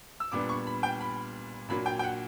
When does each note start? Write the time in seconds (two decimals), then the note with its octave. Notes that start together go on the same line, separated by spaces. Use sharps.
0.20 E6
0.32 A#2 G3 B3 D4 D6
0.49 C#6
0.67 B5
0.83 G5
1.01 B5
1.69 A#2 F#3 A#3 D4 B5
1.86 G5
1.99 G5
2.03 F#5